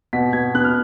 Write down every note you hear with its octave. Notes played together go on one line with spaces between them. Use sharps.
B2 B6
B2 G#6
B3 F#6
F6